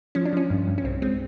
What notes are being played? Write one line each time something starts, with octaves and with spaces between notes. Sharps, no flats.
F3 C#4
D4
F3 C#4
G2
G2
C#4
C2 C4
G#3 C4